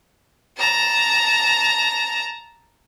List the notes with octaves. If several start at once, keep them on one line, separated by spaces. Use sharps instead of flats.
A5 A#5